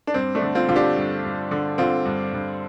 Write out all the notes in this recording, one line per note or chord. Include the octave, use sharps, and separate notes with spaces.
D4
G2 C4
A3 D4
D3
C4 F4
D3 F4
D4 G4
G2
G2
D3
D3 C4 F4
G2
G2